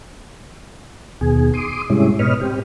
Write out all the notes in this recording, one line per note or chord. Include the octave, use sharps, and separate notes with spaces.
D#2 B2 G#4
C6 D6 D#6
G#2 C3 G3 G#3 C#4 E4
G#2 B2 B4 C#5 D#5 F6
C4 G4